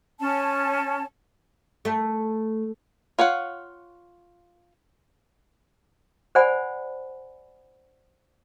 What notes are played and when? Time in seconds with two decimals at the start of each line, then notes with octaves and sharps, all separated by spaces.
0.20 C#4 A5
1.85 A3
3.19 F4 C#5 F5 F#5
6.35 C5 D5 F#5 G#5 B5